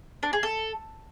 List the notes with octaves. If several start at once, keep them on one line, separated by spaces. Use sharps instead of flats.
D4
G#4
A4